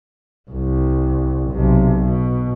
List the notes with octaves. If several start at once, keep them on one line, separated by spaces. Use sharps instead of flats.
C2
B1 C3
B2